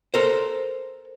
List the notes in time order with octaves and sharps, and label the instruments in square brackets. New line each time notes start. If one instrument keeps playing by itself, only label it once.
[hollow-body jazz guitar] A4 A#4 C5